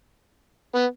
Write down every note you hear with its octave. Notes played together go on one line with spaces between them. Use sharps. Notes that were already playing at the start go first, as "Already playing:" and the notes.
B3